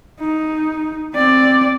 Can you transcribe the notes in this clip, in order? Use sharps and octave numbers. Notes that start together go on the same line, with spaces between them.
D#4
C4 D5